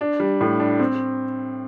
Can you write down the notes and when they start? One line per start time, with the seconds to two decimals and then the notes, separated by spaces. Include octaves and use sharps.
0.01 D4
0.20 G3
0.41 A2
0.59 D4
0.79 C4